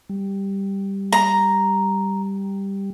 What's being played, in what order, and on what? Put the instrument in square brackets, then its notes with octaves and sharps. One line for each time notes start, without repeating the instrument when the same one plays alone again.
[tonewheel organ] G3
[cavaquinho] A#5